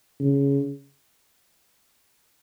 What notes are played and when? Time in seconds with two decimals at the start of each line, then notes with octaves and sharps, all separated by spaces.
0.20 C#3